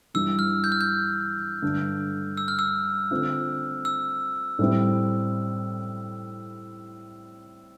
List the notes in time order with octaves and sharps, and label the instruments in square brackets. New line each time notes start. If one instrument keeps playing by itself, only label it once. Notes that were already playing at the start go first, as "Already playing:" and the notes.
[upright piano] G2 E3 G3 [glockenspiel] E6
[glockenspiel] F6
G6
F6
G6
[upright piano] G2 D3 A3
[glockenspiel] E6
F6
E6
[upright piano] D3 A3 C4 F4
[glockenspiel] E6
[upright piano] A2 G3 C4 E4